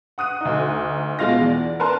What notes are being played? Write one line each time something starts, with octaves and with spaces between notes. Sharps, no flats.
F#5 D#6 F#6 D#7
D2 D#4
B2 G#3 F4 F5 A#6
E2 D5
A#4 B4 A5 C6